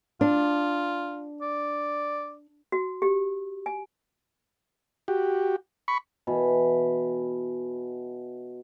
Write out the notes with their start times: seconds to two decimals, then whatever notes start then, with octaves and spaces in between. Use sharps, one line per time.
0.21 D4 F4
1.42 D5
2.72 F#4
3.02 G4
3.66 G#5
5.08 F#4 G4
5.88 B5 C#6
6.27 B2 E3 B5